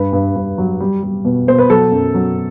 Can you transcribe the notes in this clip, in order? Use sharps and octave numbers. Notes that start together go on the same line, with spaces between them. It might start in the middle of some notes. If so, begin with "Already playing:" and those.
Already playing: G2 B4
G2
G2
F#3
G3
G3
B2
B2 C5
B4
F#3 A4
F#2
F#3